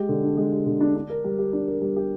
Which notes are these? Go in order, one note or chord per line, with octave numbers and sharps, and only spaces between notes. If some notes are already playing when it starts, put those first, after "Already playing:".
Already playing: G#3 G4
D3
D4
G#3
G4
D3
D4
D4
A#4
G3
G4
D4
A#4
G3
G4